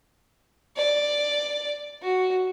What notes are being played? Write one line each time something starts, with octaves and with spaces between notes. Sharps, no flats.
D5
F#4